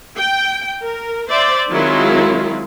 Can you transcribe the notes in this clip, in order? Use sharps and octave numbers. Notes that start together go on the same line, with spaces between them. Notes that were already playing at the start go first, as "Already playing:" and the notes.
G5
A#4
C5 D5 E5
D#3 F#3 G#3 C4 E4 F4